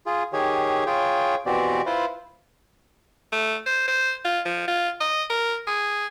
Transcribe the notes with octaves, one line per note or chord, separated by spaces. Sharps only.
F4 G#4
D#3 G4 G#4 C#5
F4 G#4 C#5 G5
B2 E3 C4 F#4 G4 D5
E4 F4 B4 C5
A3
C5
C5
F4
F3
F4
D#5
A#4
G#4